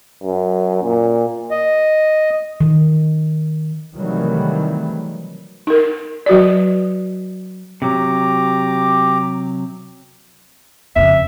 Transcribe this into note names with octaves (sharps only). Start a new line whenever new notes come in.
F#2
A#2
D#5
D#3
C3 D#3 E3 F#3 G3 A3
D#4 A#4
F#3 F#4 B4 D5
C3 F#3 G4 A#5 D6
F2 C#3 E5